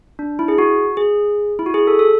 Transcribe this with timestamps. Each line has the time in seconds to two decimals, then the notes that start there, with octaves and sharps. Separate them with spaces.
0.19 D4
0.39 E4
0.48 G#4
0.58 F#4
0.97 G#4
1.59 E4
1.66 F#4
1.74 G#4
1.87 A4
1.99 A4